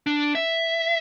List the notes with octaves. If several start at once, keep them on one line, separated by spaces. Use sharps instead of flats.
D4
E5